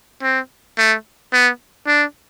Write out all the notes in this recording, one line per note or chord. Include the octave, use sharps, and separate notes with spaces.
C4
A3
B3
D4